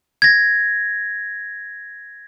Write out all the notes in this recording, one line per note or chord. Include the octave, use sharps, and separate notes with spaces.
G#6 A#6